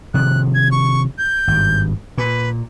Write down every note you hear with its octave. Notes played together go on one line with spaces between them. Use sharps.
C3 D#3 F3 F#6
G#6
C#6
G6
G#1 G2
A#2 B4